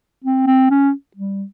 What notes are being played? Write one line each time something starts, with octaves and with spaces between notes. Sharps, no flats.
C4
C4
C#4
G3